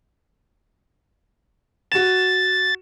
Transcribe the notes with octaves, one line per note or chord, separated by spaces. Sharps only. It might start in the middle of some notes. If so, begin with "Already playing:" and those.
F#4 A6 E7